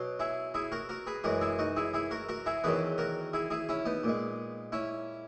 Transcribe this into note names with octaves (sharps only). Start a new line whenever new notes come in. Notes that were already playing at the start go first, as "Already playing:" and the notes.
Already playing: B2 F#3
E4 G#4
E4 G#4
F#4 A#4
F#4 A#4
G#4 B4
F#2 E3 G#3 F#4 A#4
E4 G#4
D#4 F#4
E4 G#4
E4 G#4
F#4 A#4
F#4 A#4
E4 G#4
E2 D#3 F#3 G#4 B4
F#4 A#4
E4 G#4
E4 G#4
C#4 E4
B3 D#4
A#2 G#3
C#4 E4